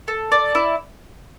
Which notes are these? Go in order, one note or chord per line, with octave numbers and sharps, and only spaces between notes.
A4
D5
E4